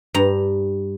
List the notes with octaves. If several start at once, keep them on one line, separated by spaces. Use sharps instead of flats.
G2 A#5